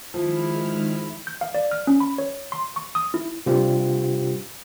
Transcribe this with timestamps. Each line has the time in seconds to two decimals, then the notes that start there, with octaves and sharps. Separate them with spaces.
0.14 D#3 F3 G#3 E4 F6
1.27 G6
1.41 F5
1.54 D5
1.71 F6
1.87 C#4
2.00 B5
2.18 C#5
2.52 C6
2.76 C#6
2.95 D#6
3.14 E4
3.46 C3 G3 D4 F4 G4 C5